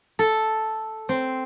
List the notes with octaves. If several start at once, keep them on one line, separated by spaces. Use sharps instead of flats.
A4
C4